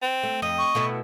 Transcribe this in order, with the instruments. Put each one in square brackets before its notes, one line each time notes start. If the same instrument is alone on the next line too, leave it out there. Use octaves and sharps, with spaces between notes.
[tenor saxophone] C4
[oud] A3
[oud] F2 [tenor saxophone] D#5
[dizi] C#6
[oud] B2 A3 E4